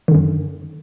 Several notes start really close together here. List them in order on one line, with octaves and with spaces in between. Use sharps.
D#3 D3 F#2